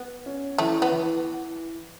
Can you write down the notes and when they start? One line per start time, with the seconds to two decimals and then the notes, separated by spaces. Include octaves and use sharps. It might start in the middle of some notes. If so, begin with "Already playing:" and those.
Already playing: B3
0.26 C#4
0.58 E3 A3
0.82 B3
0.92 E3